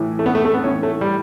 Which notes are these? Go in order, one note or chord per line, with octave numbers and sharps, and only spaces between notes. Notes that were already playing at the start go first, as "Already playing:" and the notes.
Already playing: A2 E3
A3
B3
A3
A3
B3
A2 E3 C#4
A3
G3